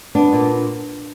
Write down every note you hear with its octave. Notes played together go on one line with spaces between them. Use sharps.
B3 D4
A#2